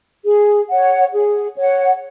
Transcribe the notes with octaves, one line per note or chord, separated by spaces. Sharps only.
G#4
C#5 F#5
G#4
C#5 F#5